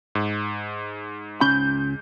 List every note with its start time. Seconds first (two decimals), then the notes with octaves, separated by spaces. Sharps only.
0.15 G#2
1.41 C#2 C#4 B5 G6